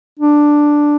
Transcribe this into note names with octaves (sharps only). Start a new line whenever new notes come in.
D4